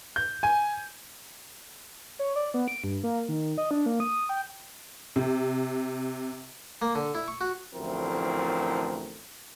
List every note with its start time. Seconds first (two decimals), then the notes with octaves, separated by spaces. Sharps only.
0.16 G6
0.43 G#5
2.19 C#5
2.36 D5
2.54 B3
2.68 D7
2.84 G2
3.04 A#3
3.29 D#3
3.58 D#5
3.71 D4
3.86 A#3
4.00 D#6
4.29 G5
5.16 C3
6.82 A#3
6.95 D3
7.15 E4
7.28 C#6
7.41 F#4
7.75 A1 D2 F3 C4 E4 A#4